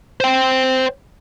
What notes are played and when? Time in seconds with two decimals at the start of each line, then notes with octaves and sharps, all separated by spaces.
0.20 C5 G5